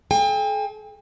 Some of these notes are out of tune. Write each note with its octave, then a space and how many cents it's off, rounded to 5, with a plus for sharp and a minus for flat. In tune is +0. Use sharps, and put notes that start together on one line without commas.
A4 -45 G5 +40